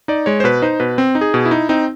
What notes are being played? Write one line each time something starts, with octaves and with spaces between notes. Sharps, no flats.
D#4 D5
G#3 C#5
C5
B2 B4
D#4 C5
B2 B4
C4
D#4
G#4
B2
E4
D#4
C4 D#4